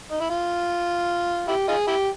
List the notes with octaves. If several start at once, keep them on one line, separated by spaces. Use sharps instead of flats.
D#4
E4
F4
E4 G4
D#4 F4 G#4
E4 G4